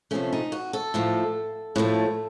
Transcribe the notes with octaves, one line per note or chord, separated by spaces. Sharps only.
C3 F3 A3 C#4
D#4
F#4
A4
A2 F3 A3
A2 F3 A3